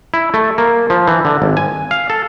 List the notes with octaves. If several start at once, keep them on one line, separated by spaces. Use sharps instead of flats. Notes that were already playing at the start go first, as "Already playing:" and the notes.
E4
A3
A#3
F3
E3
D3
G#1
G#5
F5
A4